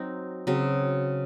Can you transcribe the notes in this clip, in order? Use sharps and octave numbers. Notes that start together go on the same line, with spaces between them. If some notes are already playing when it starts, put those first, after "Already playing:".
Already playing: F#3 C4 D#4
C#3 F#3 C4